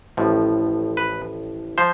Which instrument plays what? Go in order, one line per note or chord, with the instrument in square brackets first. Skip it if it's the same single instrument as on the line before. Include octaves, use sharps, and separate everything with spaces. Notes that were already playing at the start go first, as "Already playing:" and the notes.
[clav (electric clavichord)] A1 A2 F3
B4
F3 C5